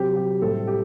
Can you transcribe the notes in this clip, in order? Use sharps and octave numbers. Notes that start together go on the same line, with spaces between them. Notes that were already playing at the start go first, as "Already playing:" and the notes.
Already playing: C3 F#3 C4 G4
G4
A2 G3 C4 A4
G4